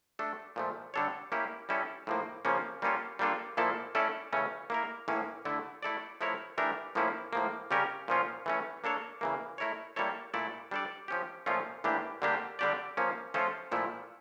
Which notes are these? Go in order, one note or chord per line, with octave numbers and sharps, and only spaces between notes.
A3 D4 A4
A#2 F3 A3
D3 G3 D4 A4 C#5
A#3 C#4 E4 G4
G3 C#4 E4 A4
A2 F3 A#3
C#3 F3 A#3 C#4
G3 A#3 C#4 F4 A4
G3 A#3 D4 F4 A4
A#2 F3 A#3 E4 A4
A3 C#4 E4 A4 D5
C#3 E3 A3 C#4
A#3 E4 A#4
A2 E3 A#3 C#4
D3 A3 E4
A3 E4 A4 D5
F3 A3 E4 A#4 C#5
E3 A3 D4 G4 A#4
A2 F3 A#3 C#4 E4
A2 F3 A#3
C#3 G3 C#4 G4 A#4
A#2 F3 C#4 F4
E3 A3 C#4
A#3 D4 A4 C#5
C#3 E3 A#3
A3 E4 A#4 C#5
G3 A#3 E4 A4 C#5
A#2 A3 E4 A4 D5
G3 D4 A4 D5
F3 C#4 G4
A#2 F3 A3 C#4 F4
A2 E3 A#3 D4 G4
D3 G3 A#3 D4 G4
D3 G3 D4 G4 D5
F3 A#3 C#4
F3 A3 C#4 F4 A4
A#2 F3 A3 E4